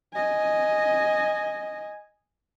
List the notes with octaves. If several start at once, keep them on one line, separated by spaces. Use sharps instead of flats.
D#5 G#5